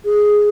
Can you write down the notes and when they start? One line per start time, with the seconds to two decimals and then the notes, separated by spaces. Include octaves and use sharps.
0.05 G#4